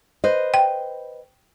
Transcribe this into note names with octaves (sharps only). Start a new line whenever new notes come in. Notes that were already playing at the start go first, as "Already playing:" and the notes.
B4 C5 D#5
G5